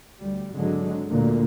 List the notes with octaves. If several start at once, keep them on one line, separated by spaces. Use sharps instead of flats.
D2 G3
G#1 D3 F#3 G#3
D2 A#2 D3 A3 A#3